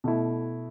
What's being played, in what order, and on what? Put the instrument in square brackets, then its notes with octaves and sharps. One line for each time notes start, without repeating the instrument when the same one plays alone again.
[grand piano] B2 A3 E4